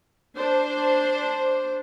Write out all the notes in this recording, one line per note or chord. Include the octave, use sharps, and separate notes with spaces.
D4 C5